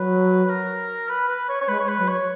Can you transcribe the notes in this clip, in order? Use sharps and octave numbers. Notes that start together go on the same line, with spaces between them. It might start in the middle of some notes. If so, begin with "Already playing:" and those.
Already playing: F#3 B4
A#4
B4
B4
C#5
C#5
G#3 B4
C#5
B4
F#3
C#5